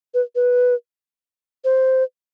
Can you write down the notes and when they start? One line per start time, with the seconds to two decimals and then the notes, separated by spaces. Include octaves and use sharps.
0.14 B4
0.36 B4
1.64 C5